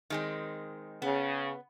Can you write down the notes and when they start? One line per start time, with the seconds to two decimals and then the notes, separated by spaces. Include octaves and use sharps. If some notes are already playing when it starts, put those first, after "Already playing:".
0.10 D#3 G#3 C4
1.02 C#3 B3